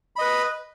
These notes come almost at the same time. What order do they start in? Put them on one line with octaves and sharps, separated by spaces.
B5 D#5 B4